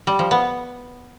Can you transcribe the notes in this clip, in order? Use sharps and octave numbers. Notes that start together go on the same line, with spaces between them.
G3
F3
B3